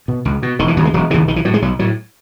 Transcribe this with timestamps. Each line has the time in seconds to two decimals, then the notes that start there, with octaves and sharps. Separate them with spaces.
0.08 B2
0.25 C#2
0.42 B2
0.59 E1 D#3
0.68 E3
0.77 D#2 C#3 F#3
0.85 G#3
0.94 E1 F#3
1.10 C#3 E3
1.14 D#2
1.28 B1 D#3
1.36 E3
1.45 A2 F#3
1.54 G#3
1.62 B1 F#3
1.79 A2 F#3